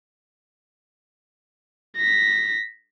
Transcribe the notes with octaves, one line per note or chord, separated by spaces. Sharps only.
A#6 B6